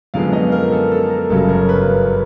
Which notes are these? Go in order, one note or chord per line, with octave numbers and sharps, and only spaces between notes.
F#2 D3 F3 G#3 B3 F5
D#5
A#4
A4
A4
A#4
G1 F#2 C#3 F#3 A4
A#4
B4